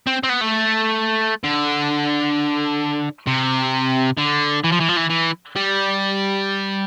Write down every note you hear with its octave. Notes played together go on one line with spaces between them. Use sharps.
C4
C4
B3
A3
D3
C3
D3
E3
F3
E3
F3
E3
E3
G3